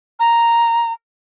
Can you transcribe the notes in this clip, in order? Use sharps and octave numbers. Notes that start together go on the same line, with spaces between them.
A#5